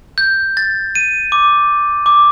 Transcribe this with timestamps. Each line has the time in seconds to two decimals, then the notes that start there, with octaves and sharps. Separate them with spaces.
0.18 G6
0.57 A6
0.95 D#7
1.32 D6
2.06 D6